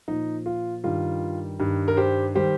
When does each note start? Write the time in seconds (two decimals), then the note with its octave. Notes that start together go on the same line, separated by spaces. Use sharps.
0.08 A#2 F3 D#4
0.46 F4
0.84 G2 D#3 G3 F4
1.60 G2 D#3 G3
1.88 A#4
1.97 G4 C5
2.35 D#3 G3 G4 C5